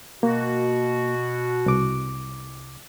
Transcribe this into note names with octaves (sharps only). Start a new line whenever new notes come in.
B2 A#3 F#4
C2 D6